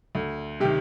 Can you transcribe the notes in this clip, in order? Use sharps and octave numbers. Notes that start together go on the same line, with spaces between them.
D2
C3 D#3 G4